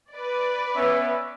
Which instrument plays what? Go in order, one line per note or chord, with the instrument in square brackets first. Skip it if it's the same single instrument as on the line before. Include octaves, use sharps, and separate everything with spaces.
[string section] B4 D5
[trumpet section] B3 C#4 E5